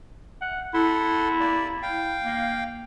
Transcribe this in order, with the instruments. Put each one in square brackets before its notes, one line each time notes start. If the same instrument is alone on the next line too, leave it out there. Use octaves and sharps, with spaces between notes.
[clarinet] F#5
[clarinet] E4 [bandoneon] A4 F#5 C6
[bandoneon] A#3 D5
F5 G5
[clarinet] A#3